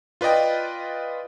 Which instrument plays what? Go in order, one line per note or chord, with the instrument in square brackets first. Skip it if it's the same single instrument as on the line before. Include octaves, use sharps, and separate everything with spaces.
[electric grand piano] F4 B4 D5 D#5 G5